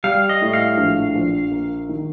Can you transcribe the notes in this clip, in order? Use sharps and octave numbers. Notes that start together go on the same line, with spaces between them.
G3 F5
D#5
A2
F5
A#1
A#1
A#3
D#3